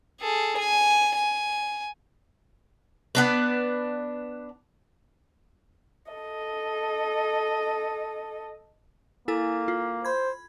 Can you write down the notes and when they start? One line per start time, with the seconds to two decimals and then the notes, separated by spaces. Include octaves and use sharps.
0.21 G#4 A4
0.58 G#5
1.16 G#5
3.15 B3 D4 B4
6.12 A4 D#5
9.28 A#3 E4 A4 G#5
9.68 F4
10.05 C5 B5 G#6